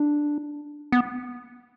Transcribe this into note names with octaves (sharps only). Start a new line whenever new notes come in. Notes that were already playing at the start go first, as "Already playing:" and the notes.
Already playing: D4
B3